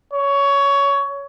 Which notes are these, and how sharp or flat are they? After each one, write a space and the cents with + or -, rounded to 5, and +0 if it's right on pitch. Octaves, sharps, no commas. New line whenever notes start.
C#5 +15